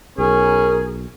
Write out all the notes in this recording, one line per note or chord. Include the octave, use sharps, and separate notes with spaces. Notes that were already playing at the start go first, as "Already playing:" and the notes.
B1 C#4 G#4 A#4